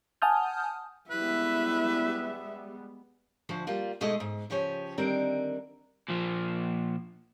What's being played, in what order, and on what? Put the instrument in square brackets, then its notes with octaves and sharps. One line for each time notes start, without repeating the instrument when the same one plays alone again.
[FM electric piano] F#5 G#5 A5 D#6 F6 G6
[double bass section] G3 G#3 B3 [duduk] E4 [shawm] B4 [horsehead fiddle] E5
[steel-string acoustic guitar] D2 F3 F#4
G3 A#3 F4
B2 G#3 A3 D#4 G#4 D#5
G#2
C#3 F3 G4 C#5 G#5
D3 D#3 G3 C4 A#4 D5
[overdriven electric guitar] A#2 F3